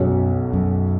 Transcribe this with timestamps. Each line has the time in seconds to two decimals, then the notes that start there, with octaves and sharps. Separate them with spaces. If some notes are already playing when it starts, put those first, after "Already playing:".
Already playing: B1 F#2 B2 G#3 C#4 F#4
0.53 F#2